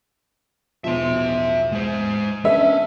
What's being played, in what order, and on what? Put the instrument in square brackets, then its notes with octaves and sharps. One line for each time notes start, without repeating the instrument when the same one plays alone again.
[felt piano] E1 B1 F3 [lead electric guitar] E5 C6
[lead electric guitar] G#3 C5
[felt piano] B3 D4 [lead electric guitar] C#4 [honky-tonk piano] E5